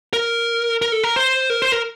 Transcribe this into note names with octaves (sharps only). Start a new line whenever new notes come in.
A#4
A#4
A4
A#4
C5
A#4
C5
A#4